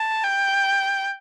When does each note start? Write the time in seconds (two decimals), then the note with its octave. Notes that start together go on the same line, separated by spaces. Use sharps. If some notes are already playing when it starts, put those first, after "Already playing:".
Already playing: A5
0.23 G5